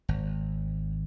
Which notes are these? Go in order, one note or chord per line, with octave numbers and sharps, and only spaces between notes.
G#1